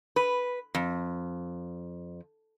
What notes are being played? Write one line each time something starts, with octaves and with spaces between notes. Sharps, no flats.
B4
F2